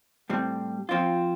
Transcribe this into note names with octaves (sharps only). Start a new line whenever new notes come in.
A2 G3 C4
F3 C4 F4